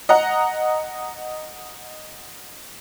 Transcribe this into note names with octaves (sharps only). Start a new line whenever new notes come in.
D#5 F#5 A#5